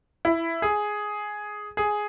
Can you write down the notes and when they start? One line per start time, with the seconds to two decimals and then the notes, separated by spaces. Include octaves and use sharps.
0.25 E4
0.62 G#4
1.77 G#4